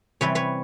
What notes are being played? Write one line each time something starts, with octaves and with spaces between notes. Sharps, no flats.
C3 E3 G3 B4 C#5
B4 C#5